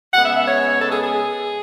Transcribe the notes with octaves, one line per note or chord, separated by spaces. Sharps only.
C#3 G#3 B3 F#5
E5
E5
C#5
A4
G#4
G#4